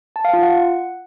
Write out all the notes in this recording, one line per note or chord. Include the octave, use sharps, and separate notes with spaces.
A5
F5
F4
F#5